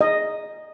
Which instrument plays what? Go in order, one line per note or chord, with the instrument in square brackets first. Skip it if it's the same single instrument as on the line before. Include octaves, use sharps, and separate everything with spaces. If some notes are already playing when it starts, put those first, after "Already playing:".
[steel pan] D#5